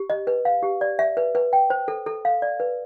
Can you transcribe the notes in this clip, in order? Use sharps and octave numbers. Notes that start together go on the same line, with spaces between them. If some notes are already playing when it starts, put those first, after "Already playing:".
Already playing: G4
D#5
B4
F5
G4
D5
E5
B4
B4
G5
C5
A4
A4
F5
D5
B4